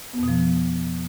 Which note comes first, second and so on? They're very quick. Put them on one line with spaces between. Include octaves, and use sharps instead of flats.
B3 F2 B2 F3